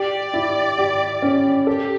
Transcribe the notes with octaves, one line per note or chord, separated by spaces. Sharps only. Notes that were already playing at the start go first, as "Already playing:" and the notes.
Already playing: G4 D5
E4
G4
C#4
G4 A4